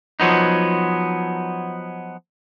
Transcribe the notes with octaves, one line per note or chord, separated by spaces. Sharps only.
F3 F#3 B3 D#4